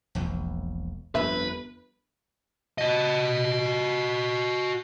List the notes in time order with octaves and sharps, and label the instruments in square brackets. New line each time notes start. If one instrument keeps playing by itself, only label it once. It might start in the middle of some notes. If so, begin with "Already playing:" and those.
[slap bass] E1 A#1 E2
[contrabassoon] G1 [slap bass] F2 [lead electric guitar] B4 [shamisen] E5
[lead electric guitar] F#4 D#5